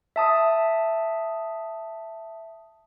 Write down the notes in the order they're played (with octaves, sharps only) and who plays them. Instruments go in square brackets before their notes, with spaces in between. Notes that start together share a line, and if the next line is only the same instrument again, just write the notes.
[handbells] E5 A5 D#6